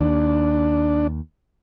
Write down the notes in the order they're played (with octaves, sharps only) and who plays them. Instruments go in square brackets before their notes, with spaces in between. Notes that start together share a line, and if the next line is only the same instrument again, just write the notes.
[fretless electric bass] D#2 [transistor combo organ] D4